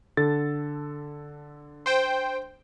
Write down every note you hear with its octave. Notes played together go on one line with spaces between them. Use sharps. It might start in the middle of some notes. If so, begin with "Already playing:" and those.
D3 A4 A6
C5 G5